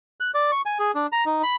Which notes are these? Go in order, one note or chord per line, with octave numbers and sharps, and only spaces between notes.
F#6
D5
C#6
G#5
G#4
D4
A#5
D#4
B5